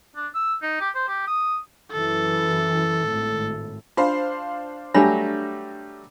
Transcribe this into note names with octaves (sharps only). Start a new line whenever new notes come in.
D4
E6
D#4
G4
C5
G4
D#6
F#2 E3 A4
G#1 A2
D4 F4 C5 F5
F#3 G3 A3 D4 C#5 B5 A#6